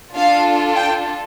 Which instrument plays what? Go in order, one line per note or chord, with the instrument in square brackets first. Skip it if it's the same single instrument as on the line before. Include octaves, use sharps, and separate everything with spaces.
[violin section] D4 F4 A4 F5
G5